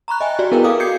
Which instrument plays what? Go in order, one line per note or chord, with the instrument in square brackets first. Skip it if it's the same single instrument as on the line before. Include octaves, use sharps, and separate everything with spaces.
[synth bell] A#5 B5 C#6 F#6
D#5 E5 G5 G#5
F#4 G4 D5
B3 E4 G#4 A#4 B4 G5
F#4 A4 F5 D6 D#6
D#6 G6 G#6 C7 C#7